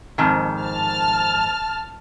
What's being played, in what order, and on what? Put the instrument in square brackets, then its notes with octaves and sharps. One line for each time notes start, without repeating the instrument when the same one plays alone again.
[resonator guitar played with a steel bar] F2 G#2 D#3
[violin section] A5 F6